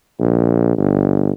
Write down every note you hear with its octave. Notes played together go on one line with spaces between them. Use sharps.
A#1
G1